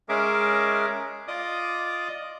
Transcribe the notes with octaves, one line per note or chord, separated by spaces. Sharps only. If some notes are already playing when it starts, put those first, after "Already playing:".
G#3 C#4 G#4 A#4 E5 D6
F4 D5 D#5 D6 D#6